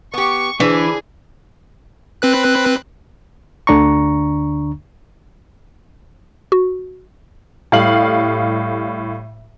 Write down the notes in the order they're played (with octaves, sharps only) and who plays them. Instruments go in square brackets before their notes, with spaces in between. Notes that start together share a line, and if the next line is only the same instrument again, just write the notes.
[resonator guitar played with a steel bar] B3 G4 [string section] C#6
[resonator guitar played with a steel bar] D3 [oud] E3 [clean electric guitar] D4 [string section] G#4
[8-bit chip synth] C4 B4 F#6
[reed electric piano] D2 D3 D4 A#5 C#6
[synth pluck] F#4
[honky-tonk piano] A2 G3 F5 F#7